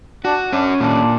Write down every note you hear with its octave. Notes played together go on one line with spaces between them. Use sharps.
D4 F#4
C#4 D4
A#2 D4